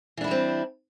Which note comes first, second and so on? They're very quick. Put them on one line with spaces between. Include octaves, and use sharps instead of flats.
E3 D4 E4 G3 C4